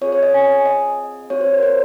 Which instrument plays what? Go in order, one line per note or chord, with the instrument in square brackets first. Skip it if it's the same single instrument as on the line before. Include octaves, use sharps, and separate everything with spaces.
[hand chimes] C4 F4 G#4 C#5
C#5
D#5
G#5
D#5
C4 F#4 C#5
C5
C#5
A#4
C5